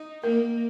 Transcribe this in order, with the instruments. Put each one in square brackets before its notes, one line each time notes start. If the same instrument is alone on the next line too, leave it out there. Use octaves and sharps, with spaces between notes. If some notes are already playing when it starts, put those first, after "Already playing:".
Already playing: [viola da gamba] D#4
[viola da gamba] A#3 [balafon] A#4